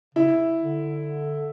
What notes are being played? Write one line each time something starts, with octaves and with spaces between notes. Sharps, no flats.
C#3 E4
D3